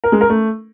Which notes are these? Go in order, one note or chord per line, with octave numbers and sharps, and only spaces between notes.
A#4
G#3
A#4
A3